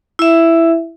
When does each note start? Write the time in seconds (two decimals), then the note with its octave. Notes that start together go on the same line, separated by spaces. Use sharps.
0.19 E4 E5